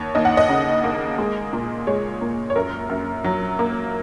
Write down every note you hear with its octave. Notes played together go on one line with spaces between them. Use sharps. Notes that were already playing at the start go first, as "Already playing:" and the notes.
Already playing: D#2 C#5
D#2 D#5
F#5
D#5
C#3
A#3
G#3
A#2
G#3 C#5
A#2
C#5
F#2 A#4
F#2
F#3
A#3